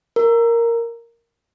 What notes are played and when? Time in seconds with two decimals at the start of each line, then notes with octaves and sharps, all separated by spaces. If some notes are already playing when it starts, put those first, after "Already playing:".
0.16 A#4